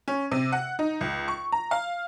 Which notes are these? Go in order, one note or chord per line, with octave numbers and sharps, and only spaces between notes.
C#4
C3
F#5
D#4
C#2
C#6
A#5
F5